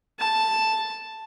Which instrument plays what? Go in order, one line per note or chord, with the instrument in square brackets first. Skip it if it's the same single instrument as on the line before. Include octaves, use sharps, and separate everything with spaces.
[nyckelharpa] A5